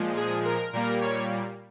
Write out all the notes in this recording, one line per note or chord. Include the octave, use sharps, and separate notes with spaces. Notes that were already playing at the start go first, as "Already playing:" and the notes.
Already playing: A#2 F3 G#3
G#4
A#4
A#2 G3 A#3 A#4
C#5